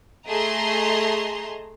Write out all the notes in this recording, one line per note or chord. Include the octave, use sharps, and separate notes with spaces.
A3 G#4 D#5 A5 A#5 C6